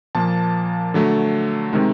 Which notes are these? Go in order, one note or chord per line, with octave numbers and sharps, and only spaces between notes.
A#2 F3 A#3 A5
D3 F#3 A3
C3 D#3 G#3